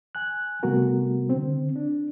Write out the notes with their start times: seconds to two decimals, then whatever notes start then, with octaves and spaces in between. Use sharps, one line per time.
0.15 G#5 F#6
0.63 C3 G3 A3 B3 F#4 A#4
1.30 D3 C4
1.76 D4